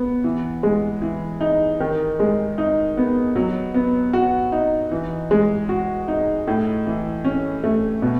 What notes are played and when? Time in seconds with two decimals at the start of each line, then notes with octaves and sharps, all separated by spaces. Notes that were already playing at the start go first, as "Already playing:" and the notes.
Already playing: B3
0.24 E3
0.63 G#3
1.02 E3
1.41 D#4
1.80 D#3
2.20 G#3
2.58 D#4
2.97 B3
3.36 F#3
3.74 B3
4.13 F#4
4.52 D#4
4.92 E3
5.31 G#3
5.69 F#4
6.08 D#4
6.47 A2
6.86 E3
7.25 C#4
7.64 A3
8.02 B2